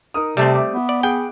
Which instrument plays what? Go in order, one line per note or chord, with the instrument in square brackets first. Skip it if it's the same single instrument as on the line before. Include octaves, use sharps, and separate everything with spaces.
[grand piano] D#4 A#4 D#6
[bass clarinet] C3 [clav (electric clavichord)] G3 A3 C4 [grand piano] A5
[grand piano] E5 D6
[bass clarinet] B3
[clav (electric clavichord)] D5
[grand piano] G#4 F#5 D7 [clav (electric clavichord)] G5